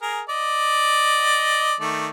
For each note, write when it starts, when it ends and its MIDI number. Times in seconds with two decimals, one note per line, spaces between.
0.02 0.21 68
0.02 0.21 70
0.29 1.74 74
0.29 1.74 75
1.80 2.09 51
1.80 2.09 57
1.80 2.09 74